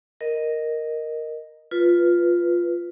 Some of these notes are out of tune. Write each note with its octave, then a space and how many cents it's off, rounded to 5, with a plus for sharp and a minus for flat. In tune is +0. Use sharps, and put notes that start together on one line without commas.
A#4 +0 D#5 -5
F4 +0 B4 +0